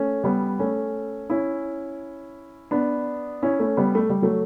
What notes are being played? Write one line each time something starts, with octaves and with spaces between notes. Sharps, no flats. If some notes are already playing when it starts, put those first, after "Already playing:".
Already playing: A3 C#4
G3 B3
A3 C#4
C#4 E4
B3 D4
C#4 E4
A3 C#4
G3 B3
A3
G3
F#3 A3